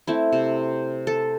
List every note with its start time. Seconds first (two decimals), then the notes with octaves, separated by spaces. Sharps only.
0.07 A3 C4 E4
0.33 C3
1.07 A4